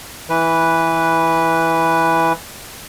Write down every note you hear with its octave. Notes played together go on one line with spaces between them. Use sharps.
E3 B4